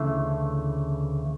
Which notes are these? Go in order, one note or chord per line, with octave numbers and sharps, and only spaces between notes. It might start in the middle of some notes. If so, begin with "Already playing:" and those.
Already playing: D2 C#3 E3 A3